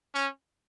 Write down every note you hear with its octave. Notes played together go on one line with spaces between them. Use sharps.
C#4